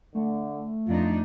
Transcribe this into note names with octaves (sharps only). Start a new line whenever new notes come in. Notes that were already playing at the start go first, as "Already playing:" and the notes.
D3 A3
F2 D4 D#4 F4